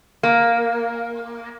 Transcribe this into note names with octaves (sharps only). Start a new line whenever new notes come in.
A#3